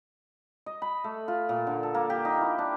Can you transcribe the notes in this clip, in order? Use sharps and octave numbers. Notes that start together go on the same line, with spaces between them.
D#5
B5
A3
F4
A#2
D3
A4
A#3
G4
D#4
E4
D4